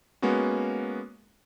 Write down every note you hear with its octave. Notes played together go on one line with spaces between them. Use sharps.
G#3 A#3 B3 C#4 F#4